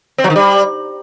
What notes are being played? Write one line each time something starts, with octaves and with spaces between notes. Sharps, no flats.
C4
F#3
D#3
G3